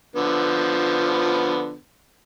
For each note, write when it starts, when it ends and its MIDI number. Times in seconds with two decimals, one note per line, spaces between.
0.16 1.76 50
0.16 1.76 53
0.16 1.76 59